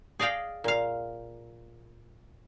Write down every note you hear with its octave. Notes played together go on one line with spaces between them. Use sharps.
G#4 D5 D#5 F5 G5
A#2 F5